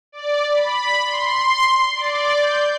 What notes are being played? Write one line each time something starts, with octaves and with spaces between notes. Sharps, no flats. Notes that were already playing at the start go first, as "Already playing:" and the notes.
D5
B5
C6
D5
G6